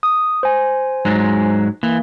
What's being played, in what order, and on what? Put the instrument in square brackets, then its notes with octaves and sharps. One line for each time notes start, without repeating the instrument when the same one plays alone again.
[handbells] D#6
C5 G#5
[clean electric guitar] G#2 F#3 G#3
[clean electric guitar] E3 [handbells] A#3